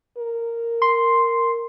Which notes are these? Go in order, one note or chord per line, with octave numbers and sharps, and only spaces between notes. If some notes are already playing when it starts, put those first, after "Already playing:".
A#4
C6